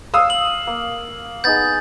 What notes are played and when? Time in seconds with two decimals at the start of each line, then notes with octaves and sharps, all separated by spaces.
0.14 F5 D#6 E6
0.30 F#7
0.67 A#3
1.44 B3 D#4 G#4 G6 A6